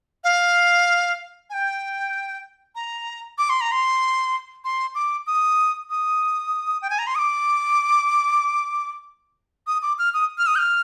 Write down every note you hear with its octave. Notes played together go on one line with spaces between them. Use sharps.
F5
G#5
G5
A#5
D6
C6
A#5
C6
C6
D6
D#6
D#6
G5
G#5
A#5
C6
D#6
D6
D#6
D6
F6
D#6
F6
D#6
G6
F6